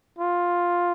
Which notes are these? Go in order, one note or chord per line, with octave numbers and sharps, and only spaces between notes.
F4